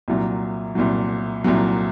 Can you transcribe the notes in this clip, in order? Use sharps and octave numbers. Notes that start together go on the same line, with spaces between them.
C2 A#2 F#3
C2 A#2 F#3
C2 A#2 F#3